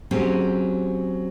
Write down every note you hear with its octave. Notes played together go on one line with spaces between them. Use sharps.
F#3 C4 C#4 G4 G#4